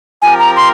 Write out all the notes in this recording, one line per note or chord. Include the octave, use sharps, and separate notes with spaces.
F3 C4 G4 A#4 G#5
A#5
C6